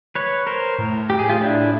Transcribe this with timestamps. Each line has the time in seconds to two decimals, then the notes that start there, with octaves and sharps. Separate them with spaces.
0.15 B4 C#5
0.47 A#4 C5
0.78 A2
1.10 G4
1.19 G#4
1.29 F4 G4
1.41 D4 E4